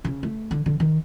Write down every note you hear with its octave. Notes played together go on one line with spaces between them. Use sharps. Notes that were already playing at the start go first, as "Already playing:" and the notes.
C#3
A3
D3
D3
D#3